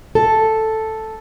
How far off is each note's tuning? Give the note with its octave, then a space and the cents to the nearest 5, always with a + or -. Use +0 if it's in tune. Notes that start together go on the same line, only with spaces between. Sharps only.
A4 +0